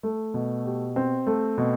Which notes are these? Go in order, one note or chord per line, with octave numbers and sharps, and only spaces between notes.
A3
B2
G4
C4
A3
B2